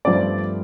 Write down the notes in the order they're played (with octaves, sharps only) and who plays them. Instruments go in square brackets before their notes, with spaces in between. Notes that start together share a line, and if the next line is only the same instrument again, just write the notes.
[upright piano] G2 F3 A3 C4 D5